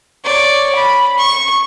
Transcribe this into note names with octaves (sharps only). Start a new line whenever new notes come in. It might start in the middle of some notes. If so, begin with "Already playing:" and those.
C#5 D5
B5
C#6